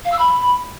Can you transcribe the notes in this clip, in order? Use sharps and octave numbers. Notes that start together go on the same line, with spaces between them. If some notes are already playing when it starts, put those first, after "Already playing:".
F5
E6
B5